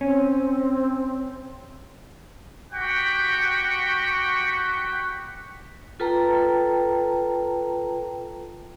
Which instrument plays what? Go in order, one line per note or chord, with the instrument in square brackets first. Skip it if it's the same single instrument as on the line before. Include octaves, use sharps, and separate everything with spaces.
[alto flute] C4 [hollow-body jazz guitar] C#4
[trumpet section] F#4 G4 F#5 G5 B5 C#6
[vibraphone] F4 A4 B4 G5 A5 A#5